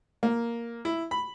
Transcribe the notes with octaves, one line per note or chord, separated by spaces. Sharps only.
A#3
E4
B5